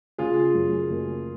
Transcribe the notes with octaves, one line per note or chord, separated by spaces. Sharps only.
C#3 F4 G#4
F#2
F#1